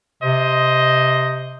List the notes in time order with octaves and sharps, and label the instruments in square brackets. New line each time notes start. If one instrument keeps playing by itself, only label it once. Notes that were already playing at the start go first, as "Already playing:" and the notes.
[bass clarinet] C3 [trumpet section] C5 D#5